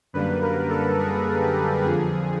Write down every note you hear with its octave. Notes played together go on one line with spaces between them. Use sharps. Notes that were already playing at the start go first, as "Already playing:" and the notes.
F#2 D3 G3 A#3 B4
A#4
A4
G#4
G4
F2 D3 F3 G#4